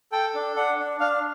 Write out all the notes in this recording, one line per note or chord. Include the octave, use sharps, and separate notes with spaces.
A4 G5
D4
D4 F#5
D4
D4 F5